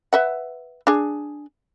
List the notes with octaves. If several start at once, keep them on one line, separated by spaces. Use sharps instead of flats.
B4 E5 F#5
D4 G#4